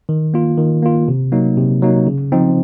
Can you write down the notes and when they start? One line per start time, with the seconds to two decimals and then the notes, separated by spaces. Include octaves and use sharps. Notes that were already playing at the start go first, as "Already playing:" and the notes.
0.09 D#3
0.34 A#3 F4
0.58 D#3
0.83 A#3 F4
1.08 C3
1.32 F#3 A#3 D#4
1.57 C3
1.82 F#3 A#3 D#4
2.07 C#3
2.32 F3 C4 D#4